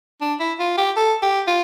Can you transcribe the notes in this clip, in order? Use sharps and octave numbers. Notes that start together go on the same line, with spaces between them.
D4
E4
F4
G4
A4
G4
F4